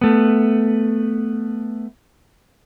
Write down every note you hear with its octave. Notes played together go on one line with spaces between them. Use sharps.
A3 B3